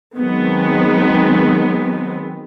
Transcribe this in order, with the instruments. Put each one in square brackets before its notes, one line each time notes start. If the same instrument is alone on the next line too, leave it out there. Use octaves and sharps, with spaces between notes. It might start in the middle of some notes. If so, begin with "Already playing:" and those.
[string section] D#3 F#3 G#3 B3 C4